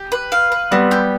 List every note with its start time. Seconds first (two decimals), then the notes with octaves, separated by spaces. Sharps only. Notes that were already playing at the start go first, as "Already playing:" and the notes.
Already playing: G4
0.12 B4
0.32 F5
0.52 B4
0.71 G3 B3 C4
0.91 G4